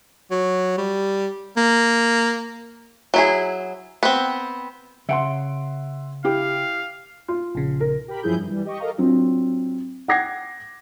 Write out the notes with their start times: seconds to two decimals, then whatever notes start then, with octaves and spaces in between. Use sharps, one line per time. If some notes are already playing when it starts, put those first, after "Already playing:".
0.31 F#3
0.78 G3
1.57 A#3
3.14 F#3 E4 G#4
4.03 B3 C4
5.09 C#3 E5 F#5 C6
6.24 E4 G4 F5
7.28 F4
7.55 A#1 C#3
7.80 A#4
8.08 G4 A#4 B5
8.22 F#2 F3 E4 G#4 G6
8.34 G2
8.46 E3 G3
8.65 G4 D#5 C#6
8.80 A4 A#4 D#5 F5 A#5
8.98 F#3 C4 D4 F4
10.08 F#5 G5 D6 G#6 A#6 C7